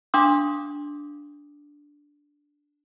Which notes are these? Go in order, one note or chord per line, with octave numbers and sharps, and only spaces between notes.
D4 F5 C6 D6 D#6